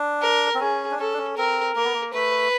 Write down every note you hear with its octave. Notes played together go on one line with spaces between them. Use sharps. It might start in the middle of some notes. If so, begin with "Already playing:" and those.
Already playing: D4
A#4
C4
C#4 G#4
D4
C#4 A4
D4
C#4
C4 A#4
A#3 A#4
B3
A#3
A3 B4